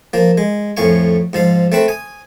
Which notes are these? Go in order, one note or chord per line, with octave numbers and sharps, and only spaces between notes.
F3 A#3
G#3
F2 A2 F5 G#5 C#6
G#2 F3 F5
A3 C4 B4
G#5 D#6